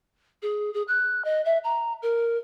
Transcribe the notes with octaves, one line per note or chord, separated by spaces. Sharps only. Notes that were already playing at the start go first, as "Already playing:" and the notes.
G#4
G#4
F#6
D#5
E5
A#5
A#4